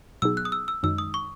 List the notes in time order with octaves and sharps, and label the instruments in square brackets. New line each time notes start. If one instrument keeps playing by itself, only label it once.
[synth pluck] B2 F#3 B3 D#4 G#4 [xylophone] E6
[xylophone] F#6
D#6
E6
E6
[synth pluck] F#2 D#3 G#3 D#4 [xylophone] E6
[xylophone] D#6
C#6